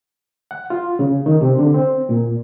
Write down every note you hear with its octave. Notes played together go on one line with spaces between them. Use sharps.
F#5
F4
C#3
D#3
C3
D3
C4
A#2